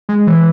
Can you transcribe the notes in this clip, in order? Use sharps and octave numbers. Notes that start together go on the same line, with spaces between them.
G#3
E3